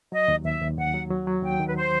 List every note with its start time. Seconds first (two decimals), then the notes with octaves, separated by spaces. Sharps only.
0.12 F#3 D#5
0.28 D#2
0.45 D#2 E5
0.61 D#2
0.78 D#2 F#5
0.94 F#3
1.10 F#3
1.27 F#3
1.43 D#2 G5
1.60 D#3
1.68 B4
1.76 C5